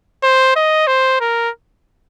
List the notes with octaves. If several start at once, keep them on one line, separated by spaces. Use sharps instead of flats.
C5
D#5
C5
A#4